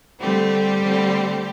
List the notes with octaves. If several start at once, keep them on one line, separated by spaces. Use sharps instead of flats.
D3 G3 A3 C4 G4
D3 A3 C4